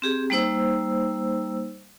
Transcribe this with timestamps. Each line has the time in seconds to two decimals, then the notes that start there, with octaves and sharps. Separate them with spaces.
0.02 C4 G4 G#4
0.30 G3 A#3 D#4 C5 E6